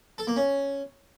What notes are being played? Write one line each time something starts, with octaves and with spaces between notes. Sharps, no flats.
A4
A#3
C#4